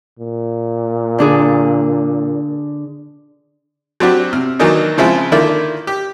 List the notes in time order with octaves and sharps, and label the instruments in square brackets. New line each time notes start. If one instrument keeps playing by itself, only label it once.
[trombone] A#2
[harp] D3 D4 G#4
[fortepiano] F#3 C4 D4 F#4 G4
C3 F6
D#3 E3 F#3 A#3 D4 D#4
C#3 F3 G#3 C4 E4 F4
D3 D#3 A#3 E4 F4 D5
G4